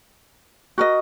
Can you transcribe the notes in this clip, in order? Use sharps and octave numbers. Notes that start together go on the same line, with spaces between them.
F#4 A#4 D#5